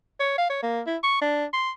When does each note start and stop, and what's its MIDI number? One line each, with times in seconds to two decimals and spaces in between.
0.20 0.36 73
0.38 0.49 77
0.50 0.60 73
0.63 0.81 58
0.86 0.97 64
1.03 1.21 85
1.21 1.45 62
1.53 1.70 84